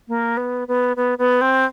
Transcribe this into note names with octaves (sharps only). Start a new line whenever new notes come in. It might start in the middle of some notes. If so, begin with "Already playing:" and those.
A#3
B3
B3
B3
B3
C4